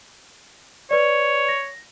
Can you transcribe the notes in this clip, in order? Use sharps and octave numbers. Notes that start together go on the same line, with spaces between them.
B4 C#5 D5
A#6